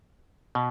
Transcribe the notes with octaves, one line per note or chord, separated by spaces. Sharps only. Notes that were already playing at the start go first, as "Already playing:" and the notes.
B2